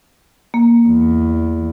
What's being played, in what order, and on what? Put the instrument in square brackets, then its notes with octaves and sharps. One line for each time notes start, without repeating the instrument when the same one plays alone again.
[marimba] A#3
[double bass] E2